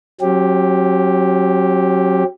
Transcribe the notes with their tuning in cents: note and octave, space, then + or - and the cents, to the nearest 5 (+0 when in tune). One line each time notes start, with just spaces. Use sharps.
F#3 +0 C#4 -45 G4 +0